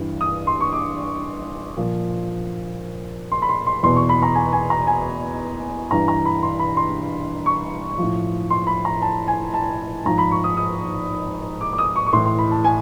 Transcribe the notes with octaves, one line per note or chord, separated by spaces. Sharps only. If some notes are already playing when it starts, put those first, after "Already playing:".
Already playing: G2 E3
D#6
C6
C#6
D6
A#2 F3
C6
B5
C6
C6
E2 B2 C6
C#6
B5
A#5
G#5
G#5
A#5
G#5
G2 E3 A#5
A#5
B5
C6
B5
C6
C#6
A2 F3
C6
B5
A#5
A5
G#5
A5
G#2 F3 A#5
B5
C#6
D#6
D#6
D6
D6
D#6
C#6
C#6
A2 E3 C6
C6
B5
A5
G#5